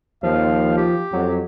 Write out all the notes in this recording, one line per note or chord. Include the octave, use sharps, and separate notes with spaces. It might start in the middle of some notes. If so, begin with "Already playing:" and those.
D#2 F3 F5
G4
F2 F#3